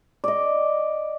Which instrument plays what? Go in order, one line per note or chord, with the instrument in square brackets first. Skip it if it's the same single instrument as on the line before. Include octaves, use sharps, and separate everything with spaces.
[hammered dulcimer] D5 D#5